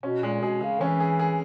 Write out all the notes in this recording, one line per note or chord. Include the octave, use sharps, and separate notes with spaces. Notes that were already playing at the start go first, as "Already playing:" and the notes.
B2 C#4
A#2 G#3
B2 G#4
C#3 G#4
E3 C#4
G#4
G#4